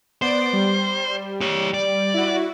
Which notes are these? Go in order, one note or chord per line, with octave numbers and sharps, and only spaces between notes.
B3 C5 D5 D7
G3
G4 C#5
D5
E4 F#4